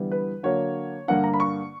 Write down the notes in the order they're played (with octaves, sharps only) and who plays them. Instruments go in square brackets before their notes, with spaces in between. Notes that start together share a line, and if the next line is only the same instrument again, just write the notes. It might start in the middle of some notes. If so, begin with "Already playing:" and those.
Already playing: [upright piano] E2 D3 G3 B3 E4
B4
D3 F#3 A#3 C#5
G2 D3 A#3 D4 F#5
A#5
B5
C#6